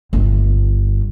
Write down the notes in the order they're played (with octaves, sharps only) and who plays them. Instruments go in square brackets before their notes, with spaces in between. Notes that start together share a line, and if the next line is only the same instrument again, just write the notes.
[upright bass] G1 G2